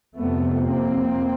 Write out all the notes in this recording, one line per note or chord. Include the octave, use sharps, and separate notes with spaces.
F2 C3 A3 B3
A#3 C4